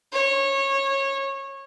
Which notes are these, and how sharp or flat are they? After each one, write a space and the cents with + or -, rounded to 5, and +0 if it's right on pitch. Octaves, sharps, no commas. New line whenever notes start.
C#5 -20